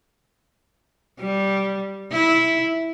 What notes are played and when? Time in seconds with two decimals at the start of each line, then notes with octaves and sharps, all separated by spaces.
1.20 G3
2.12 E4